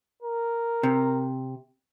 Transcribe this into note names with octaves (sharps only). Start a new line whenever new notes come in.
A#4
C3